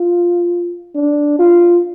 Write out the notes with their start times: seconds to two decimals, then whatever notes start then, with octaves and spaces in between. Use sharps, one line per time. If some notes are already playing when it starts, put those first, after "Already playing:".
Already playing: F4
0.95 D4
1.39 F4